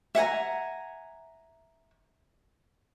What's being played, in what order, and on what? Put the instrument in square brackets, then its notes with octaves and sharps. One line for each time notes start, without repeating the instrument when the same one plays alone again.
[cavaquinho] E5 F#5 G#5 A#5